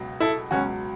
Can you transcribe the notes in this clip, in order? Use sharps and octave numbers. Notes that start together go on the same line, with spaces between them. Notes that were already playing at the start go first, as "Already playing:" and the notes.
Already playing: C#2 B2 F#3
E4 A4
C#2 B2 F#3 C#4 F#4